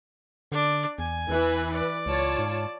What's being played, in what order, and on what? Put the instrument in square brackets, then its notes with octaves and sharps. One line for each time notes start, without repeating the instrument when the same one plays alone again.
[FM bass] D3 [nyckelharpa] D4 D5
[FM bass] E2 [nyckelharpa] G#5
[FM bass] E2 [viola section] E3 B4
[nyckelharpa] D5
[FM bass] C#2 [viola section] F4 C#5 A5
[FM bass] G#2